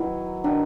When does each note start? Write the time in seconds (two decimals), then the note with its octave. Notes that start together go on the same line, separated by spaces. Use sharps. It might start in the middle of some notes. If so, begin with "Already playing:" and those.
Already playing: D#3 F#3 B3 E4
0.44 D#3 F#3 D4